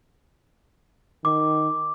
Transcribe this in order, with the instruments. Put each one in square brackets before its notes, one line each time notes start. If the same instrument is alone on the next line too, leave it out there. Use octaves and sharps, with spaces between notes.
[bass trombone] D#3 [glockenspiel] D6